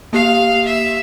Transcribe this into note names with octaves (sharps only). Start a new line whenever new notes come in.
A#3 G4 F5 C7
E5